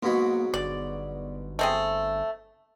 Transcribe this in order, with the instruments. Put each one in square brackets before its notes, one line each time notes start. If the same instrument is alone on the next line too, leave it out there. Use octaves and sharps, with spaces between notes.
[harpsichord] G#2 B2 F#3 [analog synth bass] A#3
[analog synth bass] G1 [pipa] D5
[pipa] A3 C4 G#4